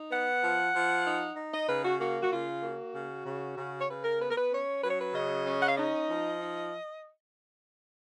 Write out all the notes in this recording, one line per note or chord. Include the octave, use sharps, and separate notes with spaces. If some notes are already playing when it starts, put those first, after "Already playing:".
Already playing: D#4
B3 F#5
F3
F3
D#4
D#4
D#5
C#3 B4
F#4
A#3 F#4
F#4
C#3 F4
A#3 F#4
C#3
C#3
C#3
C#5
C#3 B4
A#4
B3 B4
A#4
B4
C#4 C#5
F#3 B4
C#5
B4
C#3 D#5
C#4
F#5
F5
D#4 D#5
F3
D#4